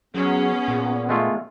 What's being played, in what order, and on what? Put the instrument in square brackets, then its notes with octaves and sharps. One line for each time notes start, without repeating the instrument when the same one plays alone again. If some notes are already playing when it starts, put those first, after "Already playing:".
[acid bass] F#3 [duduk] B3 [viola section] C#4 G#4
[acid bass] A#2
[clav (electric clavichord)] G#3 A3 F4